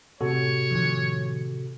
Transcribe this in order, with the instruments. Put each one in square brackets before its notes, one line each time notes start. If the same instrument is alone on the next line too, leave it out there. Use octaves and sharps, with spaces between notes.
[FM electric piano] A2 [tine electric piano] C3 F#4 A4 [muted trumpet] C#5
[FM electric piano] A2 D#3 F3